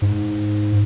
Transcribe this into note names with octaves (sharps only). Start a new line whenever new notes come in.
G#2